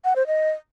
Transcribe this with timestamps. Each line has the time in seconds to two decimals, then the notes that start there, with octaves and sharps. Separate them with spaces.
0.05 F#5
0.16 C5
0.27 D#5